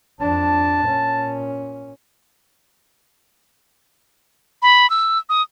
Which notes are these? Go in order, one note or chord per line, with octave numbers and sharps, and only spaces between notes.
F2 D4 A5
A#2 C#4
B5
E6
D#6